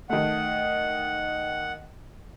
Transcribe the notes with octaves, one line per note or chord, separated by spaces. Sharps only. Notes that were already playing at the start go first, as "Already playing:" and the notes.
D#3 A3 F#5